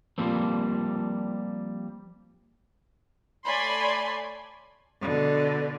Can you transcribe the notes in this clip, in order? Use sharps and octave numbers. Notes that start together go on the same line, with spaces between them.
F3 G3 A#3 C4
A3 C#5 D5 G#5 B5 C6
B2 D3